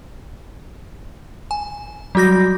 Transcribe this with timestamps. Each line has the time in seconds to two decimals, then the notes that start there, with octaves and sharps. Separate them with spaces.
1.51 G#5
2.15 F#3 G3 F#4 G6 A#6